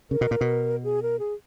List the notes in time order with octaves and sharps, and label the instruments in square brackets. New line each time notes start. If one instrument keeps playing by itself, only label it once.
[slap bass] C#3 [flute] A#4
[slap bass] B2
A#2
B2
[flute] G#4
A#4
G#4